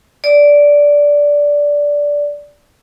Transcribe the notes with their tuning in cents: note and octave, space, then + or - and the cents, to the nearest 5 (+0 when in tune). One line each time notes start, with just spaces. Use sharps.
D5 -10